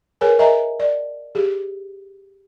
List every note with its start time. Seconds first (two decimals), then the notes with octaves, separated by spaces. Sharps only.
0.21 G#4 A#4 B4 C#5 G#5
0.39 A#4 D#5 E5 G#5 A#5
0.80 D5
1.35 G4 G#4